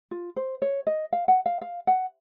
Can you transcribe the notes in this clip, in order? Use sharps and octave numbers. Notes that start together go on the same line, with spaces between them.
F4
C5
C#5
D#5
F5
F#5
F5
F5
F#5